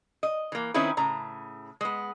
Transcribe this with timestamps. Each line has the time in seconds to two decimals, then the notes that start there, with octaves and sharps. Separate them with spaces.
0.23 D#5
0.52 E3 A#3
0.74 D#3 C4 C#4 D#4 E4 B4
0.97 A2 C#3 A#5
1.81 G#3 B3